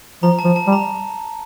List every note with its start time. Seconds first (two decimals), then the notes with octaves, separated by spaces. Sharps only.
0.23 F3 A#5
0.39 A5
0.45 F3
0.56 A5
0.67 G3
0.72 A#5